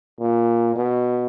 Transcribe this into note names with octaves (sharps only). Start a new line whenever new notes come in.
A#2
B2